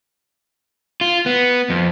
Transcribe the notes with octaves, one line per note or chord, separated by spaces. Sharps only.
F4
B3
F2